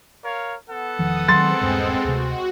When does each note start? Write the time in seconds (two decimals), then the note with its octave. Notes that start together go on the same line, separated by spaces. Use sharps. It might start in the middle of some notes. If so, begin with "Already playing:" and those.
0.23 A#4 C#5 F5
0.69 B3 A4 F#5
0.99 E1 D#3 F3 D#6
1.28 D#3 F#3 G#3 C4 C6 A6
1.61 D#1 G2
2.04 D2 C3 F#4